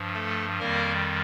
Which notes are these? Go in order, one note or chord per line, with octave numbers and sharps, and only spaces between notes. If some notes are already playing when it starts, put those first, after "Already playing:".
Already playing: G2 F3
A3 A4
F2 D#3 G3 A#3 A#4